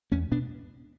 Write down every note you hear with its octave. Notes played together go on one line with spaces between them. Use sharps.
E2 A3 C#4
B2 B3 D4